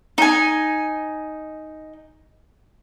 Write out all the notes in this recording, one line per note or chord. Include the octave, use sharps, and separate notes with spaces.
D#4 G#5